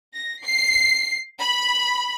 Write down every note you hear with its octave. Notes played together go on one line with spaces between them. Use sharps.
A#6
C7
B5